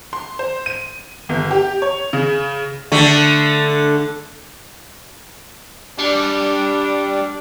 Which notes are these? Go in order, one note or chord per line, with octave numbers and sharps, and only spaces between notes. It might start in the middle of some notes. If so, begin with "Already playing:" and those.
C6
C5
D#7
G1
G4
C#5
C#3
D3 A3
G3 D4